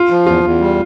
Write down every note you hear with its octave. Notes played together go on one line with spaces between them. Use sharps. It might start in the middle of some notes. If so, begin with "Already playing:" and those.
Already playing: F4
F3
E2 F4
E2
G3